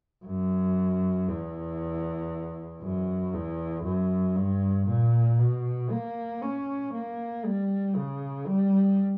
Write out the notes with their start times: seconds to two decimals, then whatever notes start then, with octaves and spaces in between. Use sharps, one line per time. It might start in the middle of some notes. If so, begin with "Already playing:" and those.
0.25 F#2
1.28 E2
2.82 F#2
3.33 E2
3.85 F#2
4.36 G2
4.88 A#2
5.39 B2
5.91 A#3
6.42 C#4
6.93 A#3
7.45 G3
7.96 C#3
8.47 G3